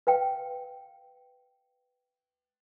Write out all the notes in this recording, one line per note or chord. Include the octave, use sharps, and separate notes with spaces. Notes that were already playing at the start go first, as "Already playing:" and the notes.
B4 F5 G5